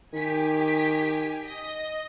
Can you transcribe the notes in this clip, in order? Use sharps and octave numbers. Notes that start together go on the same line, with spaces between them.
D#3 G4 G#5 B6
D#5